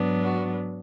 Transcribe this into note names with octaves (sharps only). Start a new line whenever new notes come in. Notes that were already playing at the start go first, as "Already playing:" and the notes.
Already playing: G#2 F#3 B3 D4
F#4